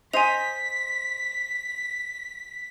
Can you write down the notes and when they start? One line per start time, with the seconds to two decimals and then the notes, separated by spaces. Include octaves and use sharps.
0.13 C5 D#5 G#5 B6 F7